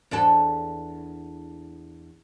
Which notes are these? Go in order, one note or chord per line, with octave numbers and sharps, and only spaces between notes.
E2 D4 A4